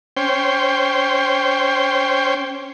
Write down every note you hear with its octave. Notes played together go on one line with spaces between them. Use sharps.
C#4 C5 G5